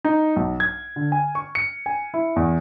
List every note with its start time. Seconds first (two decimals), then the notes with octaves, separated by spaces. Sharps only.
0.05 D#4
0.36 B1
0.60 G#6
0.96 D3
1.12 G#5
1.35 C#6
1.55 C#7
1.86 G#5
2.14 E4
2.36 E2